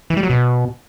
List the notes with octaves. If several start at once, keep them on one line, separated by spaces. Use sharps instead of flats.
E3
G3
F#3
B2